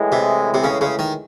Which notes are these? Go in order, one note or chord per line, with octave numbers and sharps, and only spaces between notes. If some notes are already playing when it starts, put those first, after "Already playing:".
Already playing: A2 E3 G#3
C3
C3
C#3
C#3
D#3